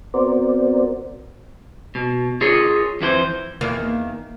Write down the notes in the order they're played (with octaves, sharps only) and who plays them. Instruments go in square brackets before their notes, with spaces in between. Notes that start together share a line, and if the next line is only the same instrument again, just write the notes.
[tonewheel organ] B3 C4 F#4 A#4 C5 D5
[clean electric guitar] B2
F4 G#4 A#4 C#5
F2 E3 F#4 C5
[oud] E2 D#3 A#3